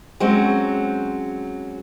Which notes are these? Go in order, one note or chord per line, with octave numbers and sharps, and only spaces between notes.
F#3 G#3 C4 C#4